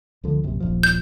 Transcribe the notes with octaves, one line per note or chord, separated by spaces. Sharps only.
C#2 D3 F3
A#1 F#2 C3
D#1 A#1 F3
G6